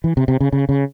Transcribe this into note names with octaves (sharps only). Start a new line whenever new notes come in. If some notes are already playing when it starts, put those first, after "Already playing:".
E3
C3
C3
C#3
C#3
C#3